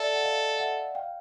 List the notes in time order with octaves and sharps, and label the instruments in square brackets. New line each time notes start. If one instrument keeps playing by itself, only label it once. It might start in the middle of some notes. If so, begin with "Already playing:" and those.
Already playing: [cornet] A4 [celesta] D5 E5
[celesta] F#5
D#5 F5
E5 F#5
F5 G5